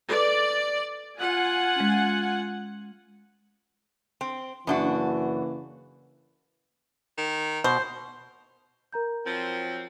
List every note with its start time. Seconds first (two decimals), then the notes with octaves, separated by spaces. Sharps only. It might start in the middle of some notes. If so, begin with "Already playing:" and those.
0.10 A4 B4 D5
1.17 F4 F#5 G#5
1.76 G#3 C#4
4.21 C4
4.67 F#2 C#3 E3 A#3 D4 F#4
7.18 D#3
7.64 B2 C5
8.93 A#4 A#5 G6
9.24 F3 F#3 C4